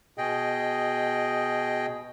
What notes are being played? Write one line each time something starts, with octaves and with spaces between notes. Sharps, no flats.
B2 G#4 D#5 G5